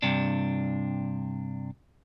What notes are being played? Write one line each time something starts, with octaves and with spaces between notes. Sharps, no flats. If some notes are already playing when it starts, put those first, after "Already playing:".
G2 C3 D4